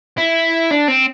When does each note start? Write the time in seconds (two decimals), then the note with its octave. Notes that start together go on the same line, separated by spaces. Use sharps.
0.18 E4
0.71 D4
0.88 C4